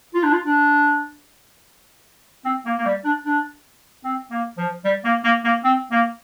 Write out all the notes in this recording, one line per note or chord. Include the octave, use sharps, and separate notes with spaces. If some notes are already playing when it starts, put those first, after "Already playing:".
F4
D4
F4
D4
C4
A#3
A#3
G3
D4
D4
C4
A#3
F3
G3
A#3
A#3
A#3
C4
A#3